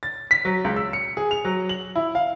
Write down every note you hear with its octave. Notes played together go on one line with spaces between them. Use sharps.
A6
B6
F#3
C#2
E6
C#7
G#4
F7
F#3
F#7
E4
F5